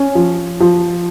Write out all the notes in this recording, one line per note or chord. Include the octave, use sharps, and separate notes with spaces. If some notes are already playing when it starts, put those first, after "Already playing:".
Already playing: C#4
F3
F3